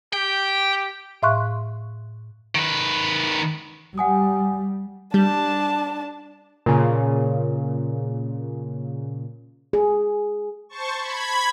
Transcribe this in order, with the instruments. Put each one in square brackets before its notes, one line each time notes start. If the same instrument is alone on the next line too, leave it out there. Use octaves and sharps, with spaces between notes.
[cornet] G4 [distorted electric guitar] G5
[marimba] A2 E5 F5 C6 C#6 F#6
[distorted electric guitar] D#3 B4
[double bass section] G3 [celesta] F#5 G#5 D#6
[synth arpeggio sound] G3 [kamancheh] D4 A5
[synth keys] A#2 C#3
[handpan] G#4
[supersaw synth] C5 A5 C#6
B5 G#6